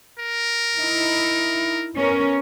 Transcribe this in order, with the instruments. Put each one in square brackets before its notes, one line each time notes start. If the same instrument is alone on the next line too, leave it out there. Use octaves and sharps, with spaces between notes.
[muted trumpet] A#4
[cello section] D#4 E4
B3 C#4 A#4